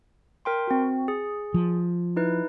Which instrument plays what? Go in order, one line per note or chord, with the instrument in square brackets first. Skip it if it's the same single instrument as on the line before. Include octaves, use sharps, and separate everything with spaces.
[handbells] A#4 G5 C6
C4 F#4
G#4
[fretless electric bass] F3
[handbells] D#4 E4 B4